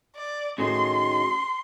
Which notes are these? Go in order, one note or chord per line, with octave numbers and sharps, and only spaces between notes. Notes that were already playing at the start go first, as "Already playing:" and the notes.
D5
A2 D#3 C#4 F#4 G#4 C6